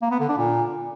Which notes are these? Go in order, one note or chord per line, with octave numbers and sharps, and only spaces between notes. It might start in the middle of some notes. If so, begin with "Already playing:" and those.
A#3
B3
D3
D4
A#2